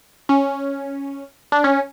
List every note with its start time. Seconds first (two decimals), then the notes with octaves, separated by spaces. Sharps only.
0.29 C#4
1.52 D4
1.64 C#4